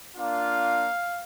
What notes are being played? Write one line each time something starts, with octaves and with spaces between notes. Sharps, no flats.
A#3 D4 F4 F5